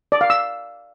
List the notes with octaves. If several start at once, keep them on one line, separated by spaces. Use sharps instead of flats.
D5
F5
E6